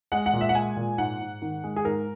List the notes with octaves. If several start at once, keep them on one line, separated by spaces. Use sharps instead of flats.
G#3 F#5
F#5
A#2
E5
F#5
G#3 G#5
A#2
G#2 F#5
G#2
D#3
G#3
G#4
G#2 A#4